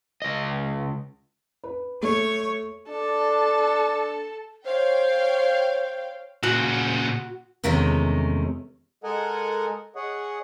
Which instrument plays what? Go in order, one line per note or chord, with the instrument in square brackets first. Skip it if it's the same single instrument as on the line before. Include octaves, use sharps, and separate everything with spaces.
[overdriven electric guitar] C#2 D#5
[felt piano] B4
[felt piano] A3 [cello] C#5
[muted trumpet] D4 [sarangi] A4
[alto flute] C5 [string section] C#5 F5 G5
[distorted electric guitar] A#2 C#3 [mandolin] F#4
[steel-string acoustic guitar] E2 C3 D#3 G#3 A3 C#4
[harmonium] G#3 A4 A#4 D#5 F#5 G#5
G#4 C#5 D#5 F#5